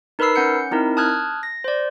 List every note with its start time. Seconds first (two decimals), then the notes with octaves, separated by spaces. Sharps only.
0.19 D#4 A#4 B4 B5 E6 C7
0.36 C#4 F#5 G6 C#7
0.71 C4 D#4 E4 A#4
0.97 A5 D#6 F6 F#6 G#6
1.43 A#6
1.64 C5 D5